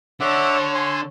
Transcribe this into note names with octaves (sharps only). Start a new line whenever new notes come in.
D3 C#5 E5 F#5 A5 D6
G#5 C6